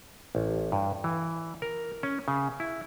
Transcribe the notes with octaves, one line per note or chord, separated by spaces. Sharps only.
A1
G2
E3
A#4
C#4
C#3
E4